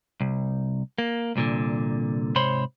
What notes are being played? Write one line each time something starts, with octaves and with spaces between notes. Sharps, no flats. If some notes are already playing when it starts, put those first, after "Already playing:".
C2
A#3
C2 A#2 D3
G#2 C3 C5 C#5 B5 C6